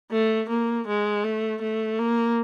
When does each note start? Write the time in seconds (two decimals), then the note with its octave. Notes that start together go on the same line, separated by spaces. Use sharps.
0.11 A3
0.49 A#3
0.87 G#3
1.24 A3
1.62 A3
1.99 A#3